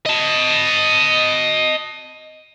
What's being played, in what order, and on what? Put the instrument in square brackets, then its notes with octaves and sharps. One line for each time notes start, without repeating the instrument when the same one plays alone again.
[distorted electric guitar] D#5 A5